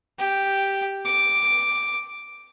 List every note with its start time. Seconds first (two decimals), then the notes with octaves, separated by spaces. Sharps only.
0.18 G4
1.05 D6